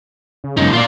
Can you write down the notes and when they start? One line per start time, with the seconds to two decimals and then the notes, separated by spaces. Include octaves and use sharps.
0.44 C#3
0.57 C#2 F#2 D#4
0.73 A#2 F4 D5